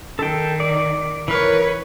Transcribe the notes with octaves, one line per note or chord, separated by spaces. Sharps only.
D#3 A4 G5
D5
E3 A#4 B4 C#5